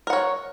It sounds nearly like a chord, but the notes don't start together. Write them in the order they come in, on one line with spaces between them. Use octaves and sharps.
A#4 F#5 C#5